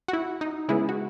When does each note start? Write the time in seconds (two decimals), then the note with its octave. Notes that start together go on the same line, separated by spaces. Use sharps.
0.08 F#4
0.13 E4
0.41 D#4
0.69 C#3 G#3 B3 E4
0.89 F#4